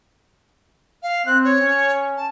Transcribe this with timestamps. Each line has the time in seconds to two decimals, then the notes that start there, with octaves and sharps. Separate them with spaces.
1.03 F5
1.26 C4 F#6
1.44 C#5
1.60 C#4
2.17 A5